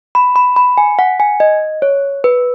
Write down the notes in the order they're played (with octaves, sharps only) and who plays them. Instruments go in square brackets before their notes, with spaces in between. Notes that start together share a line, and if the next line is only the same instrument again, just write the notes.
[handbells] B5
B5
B5
G#5
F#5
G#5
D#5
C#5
B4